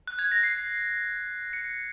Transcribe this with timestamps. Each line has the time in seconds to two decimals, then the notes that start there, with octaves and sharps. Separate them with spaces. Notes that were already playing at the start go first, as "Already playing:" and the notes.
0.07 F#6
0.19 G#6
0.32 A#6
0.43 C7
1.53 C#7